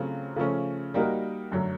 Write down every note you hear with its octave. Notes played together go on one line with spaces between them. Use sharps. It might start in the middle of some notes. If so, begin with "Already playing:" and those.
Already playing: C#3 F#3 A3 C4 F4
C#3 F3 A3 C#4
G3 A#3 D#4 F#4 A#4
F#2 D3 F#3 A3